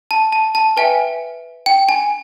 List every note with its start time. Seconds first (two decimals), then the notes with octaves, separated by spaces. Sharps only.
0.11 A5
0.32 A5
0.55 A5
0.77 B4 E5 G5 G#5
1.66 G5
1.89 G#5